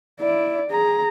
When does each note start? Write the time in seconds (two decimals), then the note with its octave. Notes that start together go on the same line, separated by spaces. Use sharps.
0.20 E4 D5
0.70 G#4 A#5